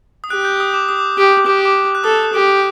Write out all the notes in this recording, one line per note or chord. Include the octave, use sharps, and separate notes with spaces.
D#6
G4 F#6
G6
D#6
D6
D#6
D6
G4 D6
G4 D6
D6
F#6
A4 D#6
G4